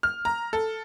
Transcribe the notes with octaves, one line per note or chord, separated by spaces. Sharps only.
F6
A#5
A4